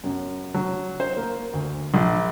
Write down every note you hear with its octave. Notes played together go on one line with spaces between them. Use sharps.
F#2
F#3
C5
A#3
D2
A#1